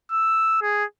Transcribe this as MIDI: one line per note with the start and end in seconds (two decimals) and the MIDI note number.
0.12 0.59 88
0.62 0.84 68